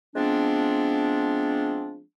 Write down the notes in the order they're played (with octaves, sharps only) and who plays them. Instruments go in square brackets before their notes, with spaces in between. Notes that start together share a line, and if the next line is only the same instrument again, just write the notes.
[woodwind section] F3 G#3 B3 C4 D4